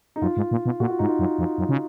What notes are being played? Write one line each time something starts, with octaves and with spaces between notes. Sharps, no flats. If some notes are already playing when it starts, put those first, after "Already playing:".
D#4
F#2 F4
G#2
A#2
B2
A#2 F#4
F4
G#2 D#4
F4
F#2
F2
F#2
C#3